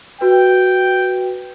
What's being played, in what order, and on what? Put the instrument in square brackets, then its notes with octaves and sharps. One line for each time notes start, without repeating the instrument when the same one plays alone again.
[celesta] F#4 B4 [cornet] G5